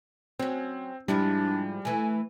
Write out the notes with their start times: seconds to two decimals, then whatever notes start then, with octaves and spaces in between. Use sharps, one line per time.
0.39 F#3 C4 C#4
1.08 G#2 F3 G3 D4 E4
1.85 E3 A3 G#5